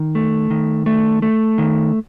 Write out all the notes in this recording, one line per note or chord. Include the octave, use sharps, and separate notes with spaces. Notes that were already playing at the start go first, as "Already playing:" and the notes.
Already playing: D#3
A3
D#3
A3
A3
D#3